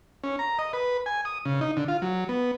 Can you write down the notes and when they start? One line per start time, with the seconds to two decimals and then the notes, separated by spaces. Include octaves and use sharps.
0.24 C#4
0.39 A#5
0.59 D#5
0.73 B4
1.06 G#5
1.25 D#6
1.45 C#3
1.61 D#4
1.77 D3
1.88 F4
2.02 F#3
2.29 B3